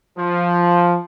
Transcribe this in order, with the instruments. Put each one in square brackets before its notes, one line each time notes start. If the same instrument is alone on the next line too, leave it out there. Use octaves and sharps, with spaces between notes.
[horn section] F3